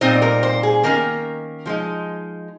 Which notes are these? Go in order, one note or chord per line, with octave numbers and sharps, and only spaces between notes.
A#2 G3 C4 D#4 C5
A#4
C5
G#4
D#3 A#3 C#4 A#4
F3 G#3 D#4